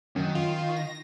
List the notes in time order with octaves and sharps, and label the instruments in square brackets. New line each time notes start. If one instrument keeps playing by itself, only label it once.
[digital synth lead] F#2 [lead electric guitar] D#3
[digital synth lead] F4
A#6